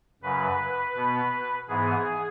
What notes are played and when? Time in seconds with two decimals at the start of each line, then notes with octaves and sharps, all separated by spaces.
0.22 F#2 C#3 F#3 B4
0.95 B2 B3
1.68 G#2 E3 B3 G#4